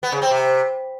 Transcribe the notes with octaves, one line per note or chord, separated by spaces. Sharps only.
B3
C#3
C4
C3